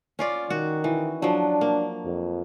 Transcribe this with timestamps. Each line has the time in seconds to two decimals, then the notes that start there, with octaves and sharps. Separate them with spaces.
0.19 C#4 F4 D5
0.50 D#3 F#4
0.84 E3
1.22 F3 F#3 D4
1.61 A#3
2.05 F2